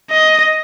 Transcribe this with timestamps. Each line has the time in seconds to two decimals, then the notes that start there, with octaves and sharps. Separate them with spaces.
0.11 D#5